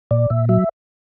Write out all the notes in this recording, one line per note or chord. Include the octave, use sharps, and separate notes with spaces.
A#2 D5
A#2 E5
F#3 E5